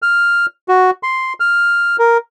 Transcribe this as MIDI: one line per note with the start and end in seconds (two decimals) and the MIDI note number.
0.02 0.46 89
0.68 0.91 66
1.03 1.33 84
1.40 1.96 89
1.99 2.18 70